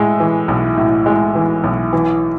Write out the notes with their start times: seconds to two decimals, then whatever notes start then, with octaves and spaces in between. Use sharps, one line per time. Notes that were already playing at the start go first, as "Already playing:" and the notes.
Already playing: A2 G#3
0.20 E3
0.48 B1
0.77 A2
1.06 G#3
1.35 E3
1.64 B1
1.93 E3